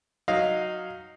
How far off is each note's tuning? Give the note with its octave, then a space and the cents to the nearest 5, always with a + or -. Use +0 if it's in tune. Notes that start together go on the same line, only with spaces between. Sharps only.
F#3 -10 D#4 +0 F5 +0